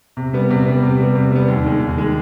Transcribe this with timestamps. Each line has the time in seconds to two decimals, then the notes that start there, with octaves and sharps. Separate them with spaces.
0.17 C3
0.33 G3 B3
0.50 C3
0.66 G3 B3
0.83 C3
0.99 G3 B3
1.15 C3
1.32 G3 B3
1.48 D#2
1.64 D#3 G#3
1.80 D#2
1.96 D#3 G#3